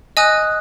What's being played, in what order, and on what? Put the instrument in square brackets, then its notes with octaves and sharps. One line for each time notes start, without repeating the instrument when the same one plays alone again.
[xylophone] D#5 G#5 D#6 F#6